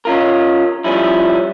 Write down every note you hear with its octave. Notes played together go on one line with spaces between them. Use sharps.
C#4 F4 A#4
F3 G3 C#4 E4